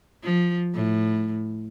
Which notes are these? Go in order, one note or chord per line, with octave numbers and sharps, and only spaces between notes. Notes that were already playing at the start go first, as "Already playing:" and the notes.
F3
A2